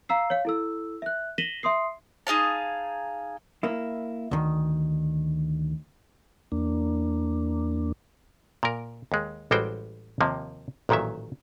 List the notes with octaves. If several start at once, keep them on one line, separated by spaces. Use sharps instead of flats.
F5 A#5 E6 C7
C#5 F5
E4 A4 E6
E5 F#6
A#6 B6 D#7 E7 F#7 G7
E5 C6 D#6 C7
D#4 G#4 F5 A5
A#3 E4
D2 D#3
E2 A#3 D4
A#2 A#4
D#2 G#3
A1 G3 G#3 F#4 C5 G5
D#2 C3 F3 A#3
A1 A#2 D#3 F#3 E5